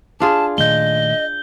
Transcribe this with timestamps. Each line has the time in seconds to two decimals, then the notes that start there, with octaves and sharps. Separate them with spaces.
0.20 D4 F4 G#4 A5
0.58 A#2 D#3 A3 D#5 G6 G7